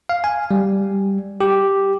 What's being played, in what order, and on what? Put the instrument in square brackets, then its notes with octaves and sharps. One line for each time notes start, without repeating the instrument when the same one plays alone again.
[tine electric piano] F5
G#5
G3
G4